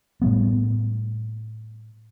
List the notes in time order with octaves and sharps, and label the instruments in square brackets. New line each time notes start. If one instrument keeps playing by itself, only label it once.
[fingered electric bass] A2 G3 B3